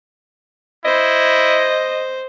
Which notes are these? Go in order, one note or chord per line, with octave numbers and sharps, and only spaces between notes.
E4 C5 D#5